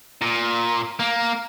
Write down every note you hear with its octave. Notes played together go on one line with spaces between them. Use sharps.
A#2
A#3